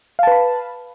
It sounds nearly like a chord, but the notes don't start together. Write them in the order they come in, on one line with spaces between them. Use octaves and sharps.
F5 A5 B4 B5